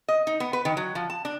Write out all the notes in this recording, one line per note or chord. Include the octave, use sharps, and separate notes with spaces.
D#5
D#4
B3
B4
D#3
F#3
F3
A5
D4